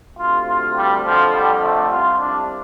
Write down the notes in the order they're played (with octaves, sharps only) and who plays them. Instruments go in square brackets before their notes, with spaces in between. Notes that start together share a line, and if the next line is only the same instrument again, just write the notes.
[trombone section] D2 C3 F4
F4
G3
F2 D3 F3
G3
A3
C2 C3 F4
D4